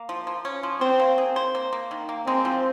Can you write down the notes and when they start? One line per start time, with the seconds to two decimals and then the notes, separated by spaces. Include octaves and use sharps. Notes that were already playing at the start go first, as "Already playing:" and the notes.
Already playing: A#3
0.09 F3
0.27 F3
0.45 C#4
0.63 F3
0.81 C4 C5
1.00 A#3
1.18 G#4
1.36 C5
1.55 A#3
1.73 A#3
1.91 D#3
2.09 A#3
2.26 G#3 C4
2.45 F3